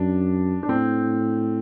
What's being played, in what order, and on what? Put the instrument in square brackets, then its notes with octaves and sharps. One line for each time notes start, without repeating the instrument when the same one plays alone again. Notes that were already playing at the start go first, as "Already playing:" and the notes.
Already playing: [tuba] F#2 [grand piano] D4
[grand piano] D4
[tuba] A2 [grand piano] C4